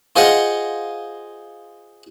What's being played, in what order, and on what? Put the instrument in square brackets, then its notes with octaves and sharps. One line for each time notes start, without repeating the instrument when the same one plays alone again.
[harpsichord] F4 G#4 C5 D#5 F5 F#5